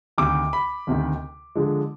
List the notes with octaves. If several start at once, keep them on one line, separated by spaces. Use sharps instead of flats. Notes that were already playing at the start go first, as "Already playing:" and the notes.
D2 C3 D#3 D6
B5
D2 C3 D#3
D3 F3 G#3